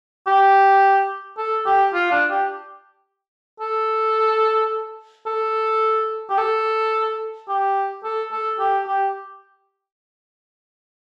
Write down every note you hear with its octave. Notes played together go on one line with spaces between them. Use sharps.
G4
A4
G4
F4
D4
G4
A4
A4
G4
A4
G4
A4
A4
G4
G4